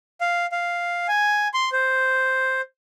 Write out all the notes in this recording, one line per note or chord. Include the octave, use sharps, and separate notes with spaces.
F5
F5
G#5
C6
C5